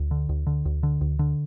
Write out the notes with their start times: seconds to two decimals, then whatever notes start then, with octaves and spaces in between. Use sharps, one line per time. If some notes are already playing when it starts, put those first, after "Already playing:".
Already playing: D2
0.11 D3
0.29 D2
0.47 D3
0.65 D2
0.83 D3
1.01 D2
1.19 D3